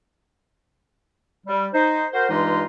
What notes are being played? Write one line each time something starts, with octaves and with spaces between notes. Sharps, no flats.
G3
D#4 C5
F#4 A#4 C5
G2 E3 G#3 D#4 F4